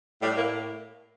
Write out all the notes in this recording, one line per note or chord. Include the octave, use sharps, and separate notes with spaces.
A2 G3
A2 A#3